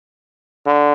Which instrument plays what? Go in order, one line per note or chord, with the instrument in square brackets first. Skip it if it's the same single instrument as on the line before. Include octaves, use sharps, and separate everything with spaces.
[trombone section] D3